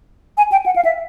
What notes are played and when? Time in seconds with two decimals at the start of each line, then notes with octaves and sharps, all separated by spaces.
0.38 G#5
0.52 G5
0.66 F#5
0.76 F5
0.85 E5